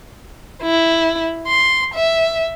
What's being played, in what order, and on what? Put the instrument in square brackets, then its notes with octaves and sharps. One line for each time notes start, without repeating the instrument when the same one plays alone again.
[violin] E4
C6
E5